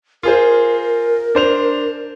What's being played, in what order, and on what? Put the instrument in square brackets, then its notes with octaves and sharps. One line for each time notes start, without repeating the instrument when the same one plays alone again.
[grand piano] F4 G#4 C5 [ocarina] A#4
[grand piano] D4 C5 F7